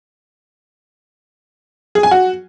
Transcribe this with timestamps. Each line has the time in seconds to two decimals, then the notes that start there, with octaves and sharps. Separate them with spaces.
1.95 G#4
2.03 G#5
2.11 F#4